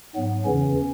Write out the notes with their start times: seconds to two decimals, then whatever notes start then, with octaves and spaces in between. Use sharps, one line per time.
0.15 G#2 F#3 B3
0.45 E2 C#3 E3 C#4